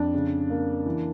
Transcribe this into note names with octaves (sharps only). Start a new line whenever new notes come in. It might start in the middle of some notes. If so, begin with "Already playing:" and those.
Already playing: F2 D4
C#3
A#3
E3